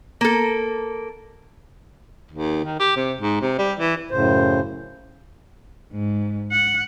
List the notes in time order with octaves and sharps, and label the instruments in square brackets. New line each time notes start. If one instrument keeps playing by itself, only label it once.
[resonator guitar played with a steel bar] A#3 A4
[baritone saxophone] D#2
D#3
G4
C3
G#2
C3
G3
E3
[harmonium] F#2 A2 C#3 C5
[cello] G#2
F#5